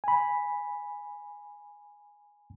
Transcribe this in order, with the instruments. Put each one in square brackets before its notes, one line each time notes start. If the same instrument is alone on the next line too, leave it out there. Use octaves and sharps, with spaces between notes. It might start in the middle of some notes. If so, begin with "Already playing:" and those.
[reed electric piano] G#5 B5